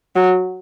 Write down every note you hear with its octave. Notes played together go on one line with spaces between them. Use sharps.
F#3